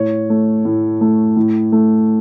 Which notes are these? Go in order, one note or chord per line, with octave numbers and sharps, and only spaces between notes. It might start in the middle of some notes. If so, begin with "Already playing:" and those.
Already playing: A2 C#5
A3
A2
A3
A2
A3